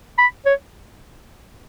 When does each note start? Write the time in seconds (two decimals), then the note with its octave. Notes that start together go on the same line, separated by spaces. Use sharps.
0.18 B5
0.46 C#5